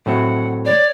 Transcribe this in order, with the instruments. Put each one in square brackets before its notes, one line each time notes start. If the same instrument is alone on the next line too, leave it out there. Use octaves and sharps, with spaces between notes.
[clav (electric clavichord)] A2 F#3 C4 [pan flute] F#5
[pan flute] C#5 [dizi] D5